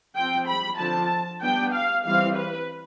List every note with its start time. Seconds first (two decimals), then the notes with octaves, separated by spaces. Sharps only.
0.16 F3 C4 G5
0.48 B5
0.79 D3 F3 C4 A5
1.41 G3 B3 D4 G5
1.73 F5
2.04 E3 G3 C4 F5
2.36 B4